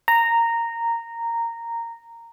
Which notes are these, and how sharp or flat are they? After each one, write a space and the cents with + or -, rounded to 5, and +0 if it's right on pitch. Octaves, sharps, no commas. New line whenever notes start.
A#5 -10